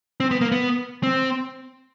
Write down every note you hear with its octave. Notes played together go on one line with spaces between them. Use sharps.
C4
B3
A#3
B3
C4